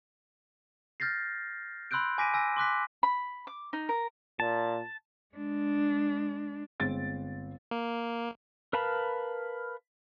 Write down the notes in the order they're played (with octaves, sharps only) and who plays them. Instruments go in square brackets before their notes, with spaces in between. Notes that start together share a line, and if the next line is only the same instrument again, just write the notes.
[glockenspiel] F6 G6 A6 A#6 C7
B5 C6 E6 F#6 G6 D7
G#5 D6 A#6 B6 D7 D#7
G#5 E6 A#6
C6 D6 F#6 B6
[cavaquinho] B5
D6
D#4
A#4
[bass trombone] A#2 [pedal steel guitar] A5
[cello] G#3 D4
[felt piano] G1 G#3 C4 A6 D7
[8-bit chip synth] A#3
[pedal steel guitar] A#4 B4 F5 A5 B5